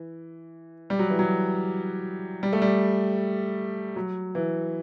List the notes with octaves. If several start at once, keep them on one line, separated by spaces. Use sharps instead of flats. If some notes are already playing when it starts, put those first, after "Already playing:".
Already playing: E3
G3
F#3
E3
F#3
G3
A3
G3
F#3
E3